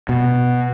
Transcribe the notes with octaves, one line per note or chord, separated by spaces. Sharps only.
B2